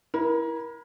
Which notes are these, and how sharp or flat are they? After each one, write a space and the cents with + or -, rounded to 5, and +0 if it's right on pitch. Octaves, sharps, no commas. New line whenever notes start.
E4 +0 A#4 +30